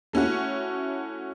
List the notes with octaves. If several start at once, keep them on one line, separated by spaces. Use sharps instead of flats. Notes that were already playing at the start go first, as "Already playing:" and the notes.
A3 C#4 E4 F#4